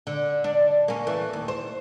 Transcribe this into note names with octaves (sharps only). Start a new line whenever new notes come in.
D3
D4
A#3 C#4
E3 A3
D#2
C5